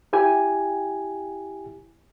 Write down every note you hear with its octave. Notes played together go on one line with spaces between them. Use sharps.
E4 G4 G5 G#5